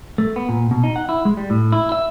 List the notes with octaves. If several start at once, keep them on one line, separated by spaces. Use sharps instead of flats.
A3
B3
A#2
B2
D#4
F#5
E4
G#3
G3
A2
E4
E5